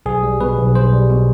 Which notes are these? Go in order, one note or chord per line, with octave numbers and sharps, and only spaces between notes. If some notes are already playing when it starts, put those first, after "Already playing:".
B1 G#4
G3
B2 B4
B1
B1 C5
G3
B2